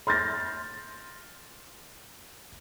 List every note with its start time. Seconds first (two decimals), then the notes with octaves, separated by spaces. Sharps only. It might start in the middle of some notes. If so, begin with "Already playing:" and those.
0.07 C6 F6 G6 A6 A#6